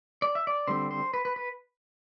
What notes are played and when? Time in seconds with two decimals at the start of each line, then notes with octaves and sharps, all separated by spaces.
0.22 D5
0.35 E5
0.47 D5
0.67 D3 G3 C4 C5
0.91 C5
1.14 B4
1.25 B4
1.36 B4